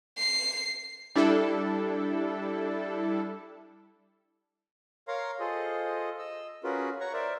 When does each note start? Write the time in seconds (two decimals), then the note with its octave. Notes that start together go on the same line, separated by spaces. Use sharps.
0.18 C7
1.16 G3 D4 E4 A4
5.08 A#4 C#5 F5 A#5 C6
5.40 F4 G#4 A4 C5 D#5
6.19 D#5 E6
6.64 C#4 F4 F#4 G#4 A#4 B4
7.00 C#5 F#5 A#5 C#6
7.13 A#4 C5 D5 E5